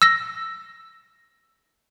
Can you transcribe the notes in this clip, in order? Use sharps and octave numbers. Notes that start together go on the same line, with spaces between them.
E6 A#6